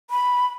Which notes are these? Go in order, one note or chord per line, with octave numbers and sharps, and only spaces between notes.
B5